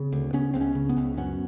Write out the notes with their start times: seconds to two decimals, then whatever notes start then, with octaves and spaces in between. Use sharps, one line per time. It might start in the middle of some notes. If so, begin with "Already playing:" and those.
Already playing: C#3 C4
0.12 D2
0.33 C#3 B3 C#4
0.54 C#2 C4
0.61 B3 C#4
0.75 C#3
0.89 B3 C#4
0.97 C#2
1.18 F#2 B3 C#4